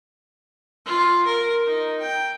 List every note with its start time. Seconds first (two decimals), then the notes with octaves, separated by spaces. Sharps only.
0.86 F4
1.25 A#4
1.66 D#4
2.00 G5